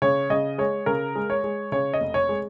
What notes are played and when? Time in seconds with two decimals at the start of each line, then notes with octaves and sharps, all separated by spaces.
0.02 C#3 C#5
0.30 C#3 D#5
0.58 G#3 C#5
0.86 C#3 A#4
1.15 G#3
1.30 C#5
1.44 G#3
1.72 C#3 C#5
1.94 D#5
2.00 F1
2.14 C#5
2.29 G#3